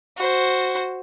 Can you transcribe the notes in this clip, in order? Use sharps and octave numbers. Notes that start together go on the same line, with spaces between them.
F#4 C5